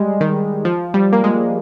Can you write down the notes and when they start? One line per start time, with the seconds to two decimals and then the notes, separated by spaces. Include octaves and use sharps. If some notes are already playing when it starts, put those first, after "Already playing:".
Already playing: G3 G#3
0.21 D#3
0.65 F3
0.94 G3
1.13 A#3
1.24 G#3